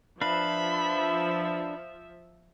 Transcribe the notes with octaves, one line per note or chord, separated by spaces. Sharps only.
F3 D4 B4 E5 F5 B5